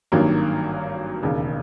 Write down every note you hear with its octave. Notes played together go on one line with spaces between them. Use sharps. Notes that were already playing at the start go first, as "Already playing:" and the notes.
G#1 G2 D#3 F#3 A#3
E1 D#2 C#3